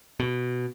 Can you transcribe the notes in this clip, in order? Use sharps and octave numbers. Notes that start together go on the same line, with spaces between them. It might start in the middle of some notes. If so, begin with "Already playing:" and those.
B2